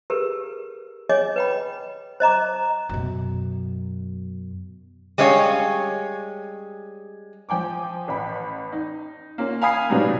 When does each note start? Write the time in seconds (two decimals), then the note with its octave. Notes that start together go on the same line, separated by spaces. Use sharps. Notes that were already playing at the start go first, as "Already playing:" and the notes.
0.10 G4 G#4 A#4 B4
1.09 G#4 C#5 D#5 G#5 D6
1.36 B4 G5 B5
2.20 C5 D#5 A#5 D6
2.89 F#2 B2
5.18 G3 G#3 C#4 C#5 F5
7.49 F3 G5 G#5 D6
8.08 A1 B5
8.72 D#4
9.38 A#3 C#4 F4
9.61 F5 G#5 B5 D#6 G#6 C7
9.89 A2 C3 F#3 B3 D4 D#4